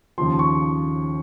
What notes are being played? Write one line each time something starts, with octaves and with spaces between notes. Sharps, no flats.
D#2 C#3 F3 C6
C#6